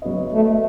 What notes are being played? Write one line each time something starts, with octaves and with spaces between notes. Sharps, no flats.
F#3 B3 F#4 B4 D#5
A3